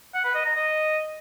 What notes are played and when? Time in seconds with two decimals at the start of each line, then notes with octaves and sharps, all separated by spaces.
0.14 F#5
0.24 B4
0.35 D#5
0.45 A#5
0.56 D#5